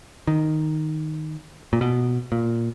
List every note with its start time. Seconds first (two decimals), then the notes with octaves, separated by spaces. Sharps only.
0.27 D#3
1.73 A#2
1.81 B2
2.32 A#2